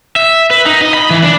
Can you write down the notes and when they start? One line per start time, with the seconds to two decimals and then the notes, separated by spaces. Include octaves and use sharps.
0.16 E5
0.51 B4
0.66 D#4
0.81 D#5
0.94 B5
1.10 E3
1.23 D4